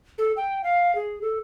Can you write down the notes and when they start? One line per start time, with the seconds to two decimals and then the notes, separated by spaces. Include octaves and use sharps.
0.18 A4
0.37 G5
0.64 F5
0.95 G#4
1.22 A4